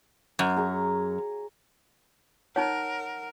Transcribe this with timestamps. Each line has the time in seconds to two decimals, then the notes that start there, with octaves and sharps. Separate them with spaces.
0.39 F#2
0.56 G#4 A#5 C#6
2.56 D#4 A#4 C#5 F#5